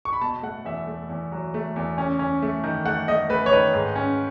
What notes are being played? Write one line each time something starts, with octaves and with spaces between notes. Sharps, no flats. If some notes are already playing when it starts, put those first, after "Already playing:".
C#6
B5
B2 A5
A3 F#5
E2 E5
A3
E2
F#3
A3
E2
C#4
C#4
A3
D#3
A3 F#5
A3 D#5
A3 B4
C#5
D#3 B4
G#2
C#4